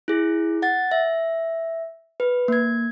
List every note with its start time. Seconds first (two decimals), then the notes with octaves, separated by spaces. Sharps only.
0.08 E4 G#4
0.62 F#5 A6
0.91 E5
2.20 B4
2.48 A#3 G#6